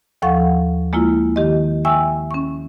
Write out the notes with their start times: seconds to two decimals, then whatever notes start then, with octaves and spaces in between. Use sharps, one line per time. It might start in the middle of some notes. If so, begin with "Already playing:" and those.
0.22 D#2 F3 A4 F5 F#5 C#6
0.93 G#3 A#3 E4 F4
1.36 D#3 G4 D#5
1.85 E5 G5 G#5 C#6 E6
2.31 C#4 C#6